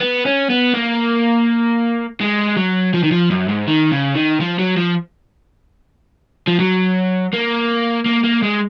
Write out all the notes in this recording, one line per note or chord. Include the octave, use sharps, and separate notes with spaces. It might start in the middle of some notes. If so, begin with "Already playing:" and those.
B3
C#4
B3
A#3
G#3
F#3
F3
D#3
F3
F#2
G#2
D#3
C#3
D#3
F3
F#3
F3
F3
F#3
A#3
A#3
A#3
G#3